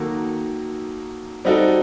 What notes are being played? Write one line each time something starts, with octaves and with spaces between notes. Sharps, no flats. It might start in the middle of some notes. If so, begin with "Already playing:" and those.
Already playing: D#3 F#3 A#3 F#4 A4
G3 C4 D#4 F#4 A4